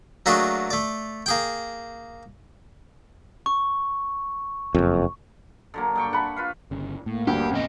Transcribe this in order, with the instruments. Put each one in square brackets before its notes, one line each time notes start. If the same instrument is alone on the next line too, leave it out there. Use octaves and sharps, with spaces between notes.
[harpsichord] F#3 A3 A#3 D4 F#4 G#4
A3 D5
A#3 G#4 G5
[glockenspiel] C#6
[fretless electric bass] F#1 F2
[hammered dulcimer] D3 F#3 A#3
G2 G5 C#6
[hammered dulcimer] F#5 [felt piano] A5 B5
[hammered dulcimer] F4 B4 F5
[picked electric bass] G1 C#3
[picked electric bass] A2 [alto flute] A#3
[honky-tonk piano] D2 [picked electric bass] G2 [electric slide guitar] G4
[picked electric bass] A1 C4 C#4 [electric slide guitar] F2 A#2 D#5